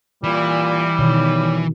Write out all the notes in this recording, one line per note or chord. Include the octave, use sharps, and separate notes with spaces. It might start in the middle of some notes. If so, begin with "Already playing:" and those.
A#2 E3 G3
B2 D#3 C#5